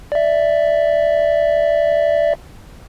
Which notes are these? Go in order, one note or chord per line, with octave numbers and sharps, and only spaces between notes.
D5 E5